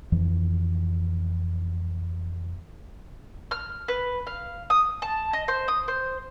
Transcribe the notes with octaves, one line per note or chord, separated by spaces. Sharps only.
F2 E3 F3
F6
B4
F5
D#6
A5
D#5
C5
D#6
C5